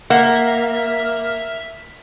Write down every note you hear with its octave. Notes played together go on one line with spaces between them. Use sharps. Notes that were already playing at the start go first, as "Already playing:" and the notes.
A#3 E5 F#5 F6